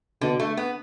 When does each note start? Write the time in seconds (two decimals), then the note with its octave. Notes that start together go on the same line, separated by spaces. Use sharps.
0.21 B2 D3
0.40 A3
0.57 B3